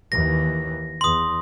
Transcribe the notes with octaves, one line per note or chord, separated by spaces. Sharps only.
D#2 E3 A#6
E2 C6 D#6